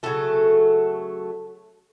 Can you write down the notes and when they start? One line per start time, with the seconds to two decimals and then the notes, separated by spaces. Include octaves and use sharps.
0.03 C#3 F#3 A3 A4